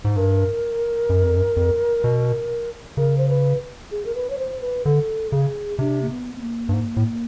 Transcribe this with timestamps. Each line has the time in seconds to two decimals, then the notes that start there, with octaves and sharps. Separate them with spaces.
0.05 G#2
0.16 G2 A#4
1.09 F#2
1.24 F2
1.36 F#2
1.56 F2
2.04 B2
2.97 C#3 A#4
3.18 C5
3.29 B4
3.91 G#4
4.05 A#4
4.15 B4
4.30 C#5
4.38 C5
4.61 B4
4.85 D3 A4
5.32 C#3 G#4
5.79 C3 D4
6.02 A#3
6.11 B3
6.36 B3
6.42 A#3
6.69 G2
6.73 G#2
6.97 A2